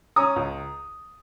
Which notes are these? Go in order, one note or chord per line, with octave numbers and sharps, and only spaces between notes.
C#4 A#5 D#6
C#2